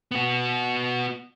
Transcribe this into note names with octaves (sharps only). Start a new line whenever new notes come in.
B3 F#4